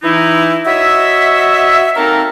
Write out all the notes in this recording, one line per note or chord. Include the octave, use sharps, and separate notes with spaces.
E3 D#4 E4
F#4 C#5 D#5 E5
A#3 C4 D#4 A4 A#4